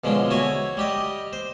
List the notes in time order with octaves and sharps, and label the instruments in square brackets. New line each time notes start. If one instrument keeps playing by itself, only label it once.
[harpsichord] B2 D3 F3 G#3 C#4
E4 F#4 C#5 G#5 C#6
G3 G4 D#5
C5